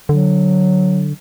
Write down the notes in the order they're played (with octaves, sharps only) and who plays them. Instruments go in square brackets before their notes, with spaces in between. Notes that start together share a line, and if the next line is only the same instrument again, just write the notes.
[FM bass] D3 [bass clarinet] F#3